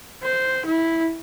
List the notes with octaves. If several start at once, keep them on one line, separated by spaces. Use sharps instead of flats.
C5
E4